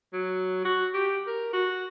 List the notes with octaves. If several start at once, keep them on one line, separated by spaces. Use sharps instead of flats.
F#3
F#4
G4
A#4
F#4